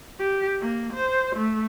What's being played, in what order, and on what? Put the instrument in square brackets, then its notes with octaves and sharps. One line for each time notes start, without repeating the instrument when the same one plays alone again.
[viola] G4
A#3
C5
A3